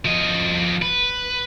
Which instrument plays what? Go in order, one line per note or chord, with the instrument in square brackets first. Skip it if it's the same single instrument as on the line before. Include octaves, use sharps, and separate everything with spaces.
[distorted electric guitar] F3 D#5
B4